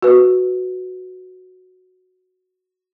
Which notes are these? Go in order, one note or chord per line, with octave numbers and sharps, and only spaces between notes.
F#4 B4